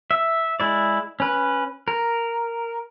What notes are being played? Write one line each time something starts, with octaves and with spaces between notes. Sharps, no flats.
E5
G#3 E4 D5
C#4 B4
A#4